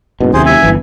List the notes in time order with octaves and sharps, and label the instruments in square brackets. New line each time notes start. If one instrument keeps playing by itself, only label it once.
[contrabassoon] F#1 [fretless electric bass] G#2 B2
[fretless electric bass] D#2 C3 [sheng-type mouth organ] G#4 C5
[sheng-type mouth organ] E5 G#5
[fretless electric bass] G1 C#2 E3